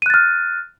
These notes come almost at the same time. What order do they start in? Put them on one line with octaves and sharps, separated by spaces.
D#7 F#6 A6 F6